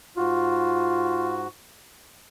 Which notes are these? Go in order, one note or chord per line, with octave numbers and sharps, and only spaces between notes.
G#2 F4 F#4